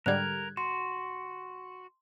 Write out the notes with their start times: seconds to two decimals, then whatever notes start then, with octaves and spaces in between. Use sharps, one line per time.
0.06 G#2 D3 G3 A#4 F#6 G#6
0.57 F#4 C6